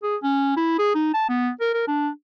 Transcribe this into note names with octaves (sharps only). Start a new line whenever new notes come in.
G#4
C#4
E4
G#4
D#4
A5
B3
A#4
A#4
D4